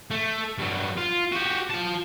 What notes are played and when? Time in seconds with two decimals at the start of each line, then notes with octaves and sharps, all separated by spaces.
0.11 A3
0.58 G2 F#3
0.97 F4
1.32 F#4 G4
1.71 F4 A5